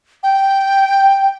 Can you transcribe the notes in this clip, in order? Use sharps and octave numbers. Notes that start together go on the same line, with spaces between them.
G5